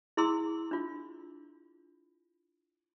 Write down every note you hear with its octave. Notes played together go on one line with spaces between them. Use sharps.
E4 G#4 A#5 C6 E6
D4 F4